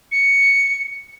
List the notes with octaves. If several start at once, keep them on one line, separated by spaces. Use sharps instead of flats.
C#7